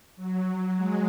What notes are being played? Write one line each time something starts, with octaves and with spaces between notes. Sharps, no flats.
F#3
G#3